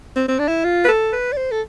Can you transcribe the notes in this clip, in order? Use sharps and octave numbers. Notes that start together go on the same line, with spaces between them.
C4
C4
D4
E4
F4
B4
A4
B4
D5
C5
A4